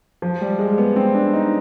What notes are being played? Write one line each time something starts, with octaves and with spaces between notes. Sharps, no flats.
F3
G3
G#3
B3
C4
D4
D#4